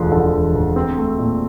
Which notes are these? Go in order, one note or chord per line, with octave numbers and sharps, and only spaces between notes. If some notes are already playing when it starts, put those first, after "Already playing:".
Already playing: E1 D2 D3 F3
D3
E1
D2
C4
A3
A#2